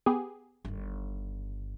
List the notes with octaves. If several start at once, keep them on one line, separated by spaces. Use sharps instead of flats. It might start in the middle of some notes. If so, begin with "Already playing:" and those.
B3 G4 G#4
G1 D#3